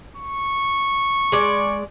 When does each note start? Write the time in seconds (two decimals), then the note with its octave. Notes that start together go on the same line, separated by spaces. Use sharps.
0.17 C#6
1.32 G#3 D5